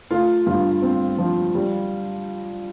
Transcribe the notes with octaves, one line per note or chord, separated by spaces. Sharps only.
A3 F4
G2 F4
C4
F3
G3